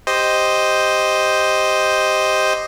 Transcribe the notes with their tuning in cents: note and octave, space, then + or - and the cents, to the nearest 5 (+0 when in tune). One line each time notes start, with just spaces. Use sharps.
G4 +0 C5 +0 D#5 +0